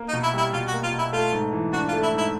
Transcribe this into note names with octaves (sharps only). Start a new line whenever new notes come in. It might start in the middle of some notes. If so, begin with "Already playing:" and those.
Already playing: A#3
D#4
B2
E4
G3 E4
B2 F4
F#4
A#3
F4
B2
E4
A3 F4
G#2
E3
D4 F#4
F4
A3
E4
G#2 E4